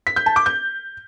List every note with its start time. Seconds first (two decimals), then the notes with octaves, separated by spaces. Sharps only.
0.07 B6
0.16 G6
0.26 A5
0.36 D6
0.46 G6